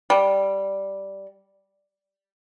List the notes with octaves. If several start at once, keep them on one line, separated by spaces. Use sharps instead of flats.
G3